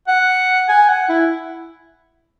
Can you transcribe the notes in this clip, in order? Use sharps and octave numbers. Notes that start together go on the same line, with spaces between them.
F#5
G#5
F#5
E4